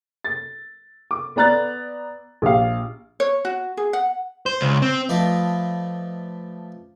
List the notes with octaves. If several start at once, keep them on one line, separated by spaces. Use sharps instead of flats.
A6
D6
B3 D5 A#5 F#6 A6
A#1 G4 F5
C#5
F#4
G#4
F#5
C5
C#2
C4
F3 A3 F4 B4 D5 D#5